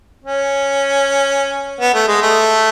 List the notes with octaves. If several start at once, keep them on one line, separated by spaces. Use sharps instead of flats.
C#4
B3
A3
G#3
A3